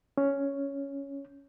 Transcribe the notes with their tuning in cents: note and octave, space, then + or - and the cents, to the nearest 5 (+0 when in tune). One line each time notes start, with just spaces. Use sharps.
C#4 +5